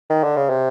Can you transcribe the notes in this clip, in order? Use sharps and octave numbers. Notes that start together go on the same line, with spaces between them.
D#3
D3
C#3
C3